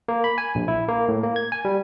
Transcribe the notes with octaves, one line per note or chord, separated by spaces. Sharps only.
A#3
B5
G#5
A#1
E4
A#3
A2
A#3
G#6
G#5
G3